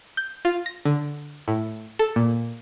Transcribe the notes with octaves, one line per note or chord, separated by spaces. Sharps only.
G6
F4
A#6
D3
A2
A4
A#2